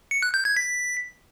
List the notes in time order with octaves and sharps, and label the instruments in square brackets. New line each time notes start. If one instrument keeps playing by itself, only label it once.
[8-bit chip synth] C#7
F#6
G6
G#6
B6